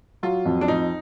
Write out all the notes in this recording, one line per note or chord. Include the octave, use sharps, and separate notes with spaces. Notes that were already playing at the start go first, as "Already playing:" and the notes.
F#3 F4
F2
D4
F2 D#4